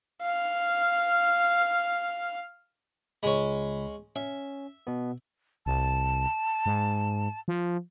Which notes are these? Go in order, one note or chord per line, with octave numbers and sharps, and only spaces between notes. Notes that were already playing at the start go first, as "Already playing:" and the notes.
F5 F6
C#2 G#3 C#4 B5
C#4 E5
B2 B3
C2 A5
G#2
F3